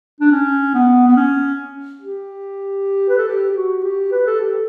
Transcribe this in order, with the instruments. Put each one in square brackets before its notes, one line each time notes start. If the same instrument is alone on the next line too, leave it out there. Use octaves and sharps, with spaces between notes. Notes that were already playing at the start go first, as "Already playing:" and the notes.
[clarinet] D4
C#4
B3
B3
C#4
G4
B4
A4
G4
G4
F#4
G4
B4
A4
G4
A4